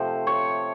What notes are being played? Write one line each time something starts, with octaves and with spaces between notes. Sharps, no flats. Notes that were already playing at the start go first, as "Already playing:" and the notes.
Already playing: C3 F3 A3 C5
C#5